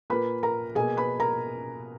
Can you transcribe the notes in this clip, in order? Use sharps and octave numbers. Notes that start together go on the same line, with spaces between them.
A#2 A#3 B4 B5
A#4 A#5
B2 A#3 G#4 G#5
B4 B5
A#4 A#5